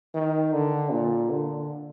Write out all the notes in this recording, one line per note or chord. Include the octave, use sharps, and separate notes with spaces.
D#3
D3
A#2
D3